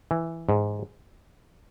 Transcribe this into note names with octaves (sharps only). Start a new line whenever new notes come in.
E3
G#2